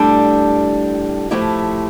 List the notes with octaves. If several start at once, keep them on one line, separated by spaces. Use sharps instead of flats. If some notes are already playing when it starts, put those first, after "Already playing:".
Already playing: A2 G3 D4 A4
A2 F3 A3 E4 G4